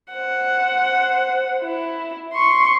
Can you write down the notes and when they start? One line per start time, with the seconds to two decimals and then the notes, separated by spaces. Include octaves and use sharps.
0.14 C5 F#5
1.62 E4
2.33 C6 C#6